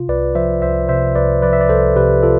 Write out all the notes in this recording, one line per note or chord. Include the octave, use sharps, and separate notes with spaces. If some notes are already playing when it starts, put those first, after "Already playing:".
Already playing: C3 F4
C2 B4 D5
F3 C5 E5
C2 C5 E5
C3 C5 E5
C2 B4 D5
F3 B4 D5
E5
D5
C2 A4 C5
C3 G4 B4
F4 A4